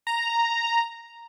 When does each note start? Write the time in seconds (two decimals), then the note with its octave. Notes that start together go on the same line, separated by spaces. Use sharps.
0.07 A#5